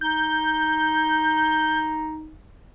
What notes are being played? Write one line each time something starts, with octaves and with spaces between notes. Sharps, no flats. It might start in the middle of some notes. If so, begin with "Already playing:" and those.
D#4 G6